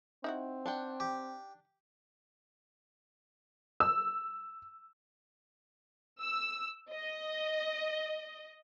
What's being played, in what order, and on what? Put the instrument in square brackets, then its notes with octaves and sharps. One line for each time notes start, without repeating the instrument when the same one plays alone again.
[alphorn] C4 [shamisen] D#4 E4 F#4
[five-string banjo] D4 F#5 G5
[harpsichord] G4
[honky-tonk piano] E6
[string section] E6
D#5